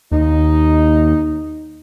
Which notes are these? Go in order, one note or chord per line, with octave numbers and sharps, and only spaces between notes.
D#2 D#4